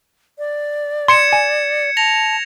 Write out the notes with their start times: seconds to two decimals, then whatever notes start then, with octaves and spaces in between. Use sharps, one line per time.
0.38 D5
1.08 C6 G#6 C#7 E7
1.33 G#5
1.97 A5 A#6 F7